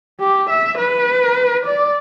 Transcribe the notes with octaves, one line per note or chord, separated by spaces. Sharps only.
G4
E5
B4
D5